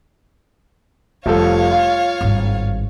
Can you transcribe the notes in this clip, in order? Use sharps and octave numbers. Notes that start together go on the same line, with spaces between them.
F1 F3 G3 A4 C#5 F5
F4
G#1 G2